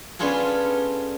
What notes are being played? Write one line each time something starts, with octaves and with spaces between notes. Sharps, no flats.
B3 C#4 D4 F4 G#4 A4